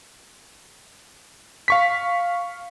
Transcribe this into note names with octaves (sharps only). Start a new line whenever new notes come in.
F5 C#6 B6